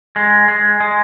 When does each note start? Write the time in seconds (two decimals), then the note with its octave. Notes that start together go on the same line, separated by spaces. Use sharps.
0.16 G#3
0.48 G#3
0.80 G#3